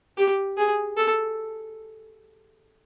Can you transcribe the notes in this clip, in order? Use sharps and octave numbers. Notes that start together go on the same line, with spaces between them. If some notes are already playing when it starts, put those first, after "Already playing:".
G4
G#4
A4